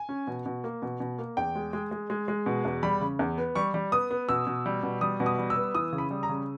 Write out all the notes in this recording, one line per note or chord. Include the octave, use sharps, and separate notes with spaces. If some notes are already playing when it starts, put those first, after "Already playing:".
Already playing: G#5
C#4
B2
B2
A#3
B2
B2
A#3
E2 G5
G#3
G#3
G#3
G#3
G#3
B2
E2
G3 B5
C#3
E2
B3
G3 C#6
G3
B3 D#6
B3
B2 E6
B2
G3
B2
G3 D#6
B2
D#6
G3
E6
B3
E3 D#6
C#3
B5
G3
A#5
C#3